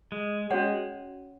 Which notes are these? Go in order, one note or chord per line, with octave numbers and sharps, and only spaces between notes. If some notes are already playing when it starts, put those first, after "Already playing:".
G#3
G#3 C#4 F#4 C#5 F#5